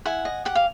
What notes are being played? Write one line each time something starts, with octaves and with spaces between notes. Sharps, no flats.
E4 F#5 G#5
D#5
G4 F#5
F5